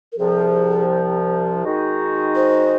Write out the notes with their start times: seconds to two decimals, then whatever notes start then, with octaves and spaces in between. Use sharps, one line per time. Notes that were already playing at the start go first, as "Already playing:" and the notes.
0.12 A#4
0.18 C2 C3 F3 G#4
1.63 D#3 G#3 D#4 F#4
2.35 C5